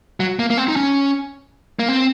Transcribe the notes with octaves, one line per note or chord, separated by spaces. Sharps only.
F#3
A#3
A#3
C4
D#4
C#4
A#3
C4